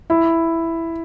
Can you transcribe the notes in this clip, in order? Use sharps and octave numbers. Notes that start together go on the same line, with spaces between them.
E4